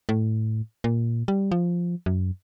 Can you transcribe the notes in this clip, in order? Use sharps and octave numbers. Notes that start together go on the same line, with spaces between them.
A2
A#2
G3
F3
F#2